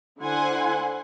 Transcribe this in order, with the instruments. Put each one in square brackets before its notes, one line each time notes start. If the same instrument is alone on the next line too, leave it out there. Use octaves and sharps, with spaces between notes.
[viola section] D3 E4 C5 F#5 G#5 C6